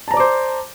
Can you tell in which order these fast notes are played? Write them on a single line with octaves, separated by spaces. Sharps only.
A5 A#5 D5 D6 C5